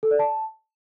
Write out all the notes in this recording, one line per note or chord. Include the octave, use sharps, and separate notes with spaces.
A4
D5
A5